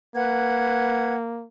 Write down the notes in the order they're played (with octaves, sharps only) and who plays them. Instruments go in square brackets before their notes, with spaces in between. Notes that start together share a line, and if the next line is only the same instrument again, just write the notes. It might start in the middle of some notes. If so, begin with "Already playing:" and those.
[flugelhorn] A#3 [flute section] B4 F#5 G#6